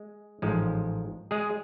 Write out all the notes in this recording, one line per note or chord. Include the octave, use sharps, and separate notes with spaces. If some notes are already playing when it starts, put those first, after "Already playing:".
Already playing: G#3
A1 G#2 F3 G#3
G#3 G#4